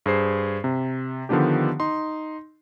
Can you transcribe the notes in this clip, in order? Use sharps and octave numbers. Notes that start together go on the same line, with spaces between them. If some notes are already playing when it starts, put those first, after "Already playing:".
G2 G#4 C5 C7
C3
D3 D#3 F3 B3 D4 G4
D#4 C6